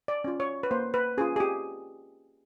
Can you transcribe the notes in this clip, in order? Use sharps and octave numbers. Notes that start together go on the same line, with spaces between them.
D5
C#4 F4
C#5
B4
A#3 C5
B4
C#4 F4 G#4
G#4
G4